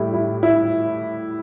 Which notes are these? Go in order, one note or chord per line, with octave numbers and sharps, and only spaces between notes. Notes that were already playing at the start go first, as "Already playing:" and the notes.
Already playing: A2 G3 E4
E4
E4